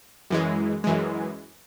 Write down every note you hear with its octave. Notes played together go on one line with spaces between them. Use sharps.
F#2 E3 G#3
F#2 E3 G#3